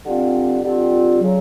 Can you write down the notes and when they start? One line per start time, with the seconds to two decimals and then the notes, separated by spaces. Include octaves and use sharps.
0.05 D3 G3 C4 F4
0.63 D3 G3 C4 F4
1.21 C#3 F#3